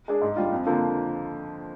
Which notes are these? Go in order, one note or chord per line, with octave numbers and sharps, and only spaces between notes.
G#3 D4 G#4
G#2
G3 D4 F4
F2
D3 F3 A#3